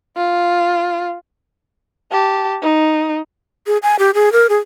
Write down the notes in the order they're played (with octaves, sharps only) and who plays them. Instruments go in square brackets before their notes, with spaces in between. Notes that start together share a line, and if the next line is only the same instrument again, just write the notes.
[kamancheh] F4
G4 A5
D#4
[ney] G#4
G#5
G4
G#4
A#4
G#4